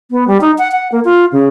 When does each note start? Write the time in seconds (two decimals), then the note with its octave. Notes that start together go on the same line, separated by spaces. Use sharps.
0.11 B3
0.28 G3
0.41 D#4
0.58 F#5
0.72 F#5
0.92 A#3
1.05 F4
1.32 C#3